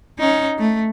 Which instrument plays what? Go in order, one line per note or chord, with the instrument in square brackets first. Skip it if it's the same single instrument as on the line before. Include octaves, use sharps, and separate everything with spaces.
[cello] C#4 D#4
A3